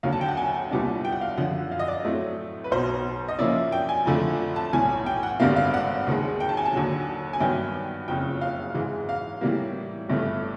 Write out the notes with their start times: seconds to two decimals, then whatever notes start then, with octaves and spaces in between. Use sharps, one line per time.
0.03 D#2 D3 F#3 F5
0.12 A5
0.21 G5
0.28 F#5
0.37 G#5
0.71 C2 A#2 G3 B3 D4
1.05 G5
1.12 F#5
1.21 F5
1.37 F#2 D3 F3 F#5
1.71 F5
1.79 D#5
1.88 D5
2.04 A2 F#3 A3 C4
2.64 B4
2.71 B1 B2 F#3 C5
3.28 D#5
3.39 A#2 F3 A#3 C#4 E4 D5
3.72 G5
3.89 G#5
4.05 F2 D3 F3 A3
4.56 A5
4.73 B1 A2 E3 G#5
5.06 G5
5.23 F#5
5.40 G#1 G2 D3 G3 A#3 F5
5.56 F5
5.74 F#5
6.07 D#2 D#3 G#3
6.40 G5
6.49 A5
6.57 G#5
6.65 A5
6.73 D#2 D3 F#3
7.33 G#5
7.40 G2 D#3 F#3 B3 G5
8.08 F#1 F2 C#3 G5
8.41 F5
8.74 G#2 E3 G#3
9.09 F5
9.41 A2 E3 G3 A#3
10.09 G1 G2 E3 A3